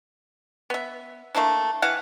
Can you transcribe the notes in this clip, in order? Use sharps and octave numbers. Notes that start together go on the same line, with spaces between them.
B3 E5
A3 A#3 D4 E4
E3 E4 F5 F#5